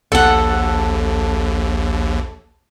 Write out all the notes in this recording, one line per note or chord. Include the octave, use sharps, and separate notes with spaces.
A#1 D#2 A4 F#5